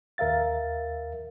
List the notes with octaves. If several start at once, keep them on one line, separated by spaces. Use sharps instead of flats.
D#2 A#4 E5 F5 A6